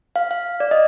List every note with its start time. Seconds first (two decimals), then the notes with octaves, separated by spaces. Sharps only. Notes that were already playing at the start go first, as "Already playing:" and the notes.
0.16 F5
0.31 F5
0.60 D5
0.71 D#5